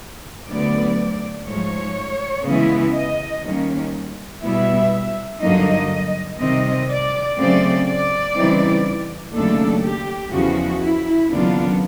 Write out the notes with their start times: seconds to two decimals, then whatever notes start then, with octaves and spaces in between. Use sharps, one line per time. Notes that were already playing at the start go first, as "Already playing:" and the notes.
0.49 D2 D3 F#3 B3 D5
1.47 G#2 F3 A3 C#5
2.46 C#3 E3 G#3 B3 E4
2.95 D#5
3.44 D#2 D#3 G3 A#3 C#4
4.43 B2 G3 B3 E4 E5
5.41 G2 D3 F#3 A#3 D#4 D#5
6.39 C3 D#3 G3 C4 D#5
6.89 D5
7.37 C#3 F#3 A3 C4 D5
7.87 D5
8.35 C#3 E3 G3 C4 D#4
9.34 D#2 C#3 F#3 A3 D4 A4
9.84 G4
10.32 E2 C#3 F3 F#4
10.82 E4
11.30 D#2 C#3 F#3 B3 D4 F4